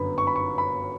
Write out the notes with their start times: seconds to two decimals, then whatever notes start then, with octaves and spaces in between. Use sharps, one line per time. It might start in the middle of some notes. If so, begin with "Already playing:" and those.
Already playing: G1 F#2 D3 F#3 B3 B5
0.18 C#6
0.27 B5
0.36 C#6
0.58 B5